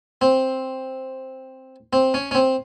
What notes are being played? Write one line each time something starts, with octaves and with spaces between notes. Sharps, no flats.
C4
C4
C#4
C#4
C4